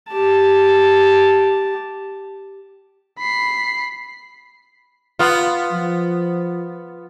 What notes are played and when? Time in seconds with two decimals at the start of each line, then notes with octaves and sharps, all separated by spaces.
0.12 G4 A5
3.19 B5 C7
5.19 B3 F4
5.72 F3